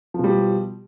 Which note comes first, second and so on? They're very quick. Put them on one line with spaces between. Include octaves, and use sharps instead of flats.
F3 B2 G3